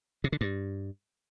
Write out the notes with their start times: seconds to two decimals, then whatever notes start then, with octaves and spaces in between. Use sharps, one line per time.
0.24 C3
0.32 D3
0.41 G2